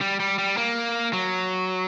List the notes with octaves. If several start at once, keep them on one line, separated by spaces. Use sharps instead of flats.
G3
G3
G3
A#3
F#3